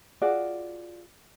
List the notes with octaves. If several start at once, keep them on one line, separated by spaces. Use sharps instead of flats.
F4 F#4 G#4 D5